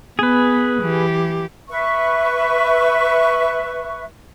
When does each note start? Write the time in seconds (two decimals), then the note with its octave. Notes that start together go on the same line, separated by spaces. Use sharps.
0.19 B3 G#4 B4
0.82 E3 G4
1.69 B4 E5 C#6